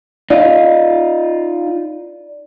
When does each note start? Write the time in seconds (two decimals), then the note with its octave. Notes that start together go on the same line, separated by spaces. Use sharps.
0.30 D#4 F4 D5